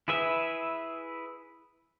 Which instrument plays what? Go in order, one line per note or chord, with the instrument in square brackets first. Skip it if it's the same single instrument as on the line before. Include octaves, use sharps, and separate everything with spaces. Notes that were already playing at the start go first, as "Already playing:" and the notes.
[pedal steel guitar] E4 G#4 B4 E5